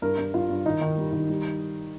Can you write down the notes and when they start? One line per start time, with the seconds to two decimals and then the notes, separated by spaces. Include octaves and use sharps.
0.02 G2 A#4
0.18 G2
0.34 G2 F4
0.50 G2
0.66 D#3 D#4
0.81 D#3
0.98 G3
1.13 D#3
1.29 G3